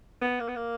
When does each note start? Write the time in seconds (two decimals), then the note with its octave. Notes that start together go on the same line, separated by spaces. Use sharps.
0.21 B3
0.40 A#3
0.48 B3
0.56 A#3